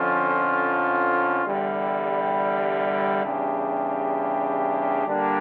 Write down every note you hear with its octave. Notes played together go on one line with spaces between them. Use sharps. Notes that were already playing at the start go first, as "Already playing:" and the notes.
Already playing: F2 D3 F3 C#4 F4
E2 D3 G3
E2 C#3 G3 D4 G4
D3 G3 A#3 D4